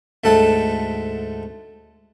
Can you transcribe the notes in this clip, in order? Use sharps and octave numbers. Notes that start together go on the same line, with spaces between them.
D2 G#2 A3 A4 F#5 A5